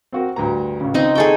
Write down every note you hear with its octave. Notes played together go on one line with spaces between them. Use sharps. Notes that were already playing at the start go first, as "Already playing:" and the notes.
C4 F#4 A#4
D2 G2 A#5
C#2 C#3
C4 D#4
G#4 A4 G5 C#6